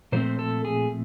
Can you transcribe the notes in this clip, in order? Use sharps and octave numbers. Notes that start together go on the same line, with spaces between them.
A#2 F3 A3 C4 C5
A4
G#4